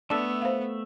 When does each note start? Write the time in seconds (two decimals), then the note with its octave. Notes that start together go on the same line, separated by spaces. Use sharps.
0.10 A3 B3 D4 A4 E5
0.42 C5 F5